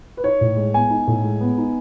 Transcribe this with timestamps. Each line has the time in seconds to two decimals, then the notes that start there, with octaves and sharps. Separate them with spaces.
0.17 B4
0.24 D#4 C#5
0.41 A2
0.56 G#3
0.73 B3 G#5
0.90 D#4
1.07 A2
1.23 G#3
1.41 B3
1.58 D#4